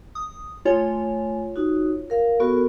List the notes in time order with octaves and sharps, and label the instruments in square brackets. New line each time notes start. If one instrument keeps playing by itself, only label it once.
[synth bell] D#6
[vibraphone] A3 G#5 [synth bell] F4 C#5
[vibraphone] D#4 F#4
A#4 F5
[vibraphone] B3 F#4 A4 [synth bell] A#4 C#6